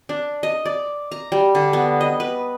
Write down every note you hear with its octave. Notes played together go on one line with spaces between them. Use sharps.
D4
D#5
D5
A#5
G3
D3
B3
D#5
B4